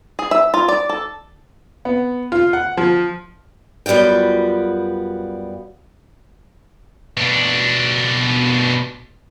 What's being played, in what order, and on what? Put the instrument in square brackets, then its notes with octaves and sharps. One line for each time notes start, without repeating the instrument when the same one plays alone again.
[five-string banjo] G#4
E5
F4
D5
A4
[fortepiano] B3
F4
F#5
F3
[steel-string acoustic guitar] F#2 G3 B3 F4 G5
[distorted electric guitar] B2 D4